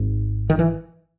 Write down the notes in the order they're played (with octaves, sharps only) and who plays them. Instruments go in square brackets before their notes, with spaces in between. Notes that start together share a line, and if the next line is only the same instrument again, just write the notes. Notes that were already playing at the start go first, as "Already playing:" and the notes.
Already playing: [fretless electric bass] G#1 G#2
D#3
E3